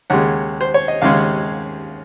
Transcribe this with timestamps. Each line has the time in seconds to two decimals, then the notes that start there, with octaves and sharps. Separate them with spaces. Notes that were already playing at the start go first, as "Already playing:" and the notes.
0.10 D#2 C#3 G#3 F#5
0.61 C5
0.74 C#5
0.88 D#5
1.02 D#2 C#3 G#3 F5